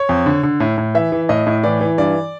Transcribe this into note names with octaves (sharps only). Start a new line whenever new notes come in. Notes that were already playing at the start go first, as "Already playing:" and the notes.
Already playing: C#5
F2
D3
D3
A2
A2
E3 E5
E3
A2 D#5
A2
E3 D5
E3
G2 D5